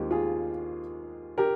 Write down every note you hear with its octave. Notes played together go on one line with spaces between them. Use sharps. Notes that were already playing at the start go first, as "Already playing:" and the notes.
Already playing: D#2 D#3 G#3 C4 F4 G4
F4 G#4
G4 A#4